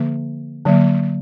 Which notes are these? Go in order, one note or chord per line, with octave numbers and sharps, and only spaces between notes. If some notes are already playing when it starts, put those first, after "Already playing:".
Already playing: D3 F3 A#3
D3 F#3 A#3